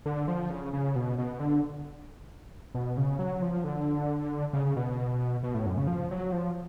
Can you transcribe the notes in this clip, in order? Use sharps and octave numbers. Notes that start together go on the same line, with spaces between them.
D3
F3
C#3
C#3
B2
B2
D3
B2
C#3
F#3
F3
D3
C#3
B2
B2
A2
F#2
C#3
F3
F#3
F3